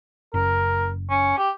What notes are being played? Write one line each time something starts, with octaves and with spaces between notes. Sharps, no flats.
F#1 A#4
C#4
G4